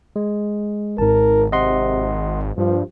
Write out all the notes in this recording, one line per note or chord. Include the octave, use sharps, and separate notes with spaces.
G#3
G#1 G#2 A#4 A5
C3 D#5 F#5 C6
G2 F3